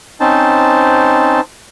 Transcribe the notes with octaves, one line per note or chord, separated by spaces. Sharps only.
C4 C#4 D#4 C5 A5